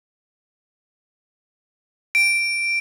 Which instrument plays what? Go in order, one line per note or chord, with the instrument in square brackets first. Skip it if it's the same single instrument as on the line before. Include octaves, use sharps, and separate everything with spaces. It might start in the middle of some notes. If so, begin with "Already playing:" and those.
[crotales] D7